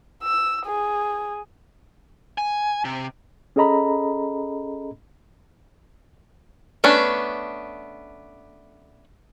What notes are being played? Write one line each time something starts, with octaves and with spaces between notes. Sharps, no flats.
E6
G#4
G#5
C3
C#4 G#4 A4 D#5 A#5 B5
A3 B3 C#4 D4